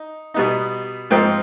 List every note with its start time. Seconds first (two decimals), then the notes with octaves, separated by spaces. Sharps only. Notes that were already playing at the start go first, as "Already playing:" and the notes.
Already playing: D#4
0.34 B2 G3 B3 D#4
1.11 G#2 F3 C4 D#4 G5